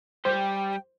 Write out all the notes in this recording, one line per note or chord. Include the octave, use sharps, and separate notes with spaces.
G3 G4 C5 G5